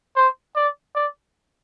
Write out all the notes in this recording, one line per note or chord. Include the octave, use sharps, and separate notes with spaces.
C5
D5
D5